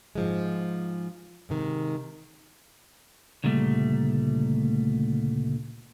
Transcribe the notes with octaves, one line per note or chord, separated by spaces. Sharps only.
G#2 F3 G#3
G#2 C3 D#3
D2 A#2 C#3 G3 A3